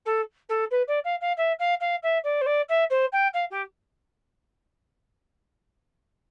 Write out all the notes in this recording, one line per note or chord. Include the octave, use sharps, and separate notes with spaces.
A4
A4
B4
D5
F5
F5
E5
F5
F5
E5
D5
C5
D5
E5
C5
G5
F5
G4